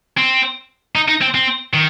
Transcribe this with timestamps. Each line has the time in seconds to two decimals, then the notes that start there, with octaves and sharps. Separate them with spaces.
0.17 C4
0.95 D#4
1.09 D#4
1.22 C4
1.35 C4
1.74 D#3